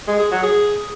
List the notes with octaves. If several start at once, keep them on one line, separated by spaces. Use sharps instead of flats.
G#3
G#4
F#3
G#4